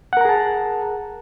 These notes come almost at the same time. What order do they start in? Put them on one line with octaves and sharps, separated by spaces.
F#5 A#4 A#5 G#4 A5